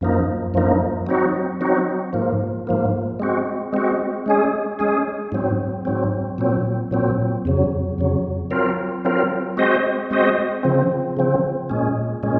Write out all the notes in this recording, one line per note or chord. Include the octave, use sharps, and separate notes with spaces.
F#2 F3 A#3 D#4
F#2 F3 A#3 D#4
F#3 C4 D#4 F#4
F#3 C4 D#4 F#4
G#2 F3 A#3
G#2 F3 A#3
G#3 C4 F#4
G#3 C4 F#4
G#3 C#4 G#4
G#3 C#4 G#4
G#2 F#3 C4
G#2 F#3 C4
A#2 F#3 C4
A#2 F#3 C4
F2 C#3 F#3
F2 C#3 F#3
F#3 C4 F4 A#4
F#3 C4 F4 A#4
G#3 C4 F#4 C5 D#5
G#3 C4 F#4 C5 D#5
C#3 F3 C4
C#3 F3 C4
A#2 G#3 C#4
A#2 G#3 C#4